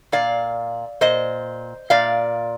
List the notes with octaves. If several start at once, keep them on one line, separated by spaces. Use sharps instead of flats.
A#2 D5 F5
A#2 C5 D#5
A#2 D5 F5